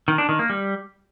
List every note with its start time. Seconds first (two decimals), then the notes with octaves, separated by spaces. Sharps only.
0.08 D#3
0.18 D4
0.29 D#3
0.39 A#3
0.50 G3